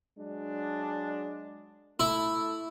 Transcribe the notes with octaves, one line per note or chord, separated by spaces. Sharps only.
F#3 G#3 D4
A3 E4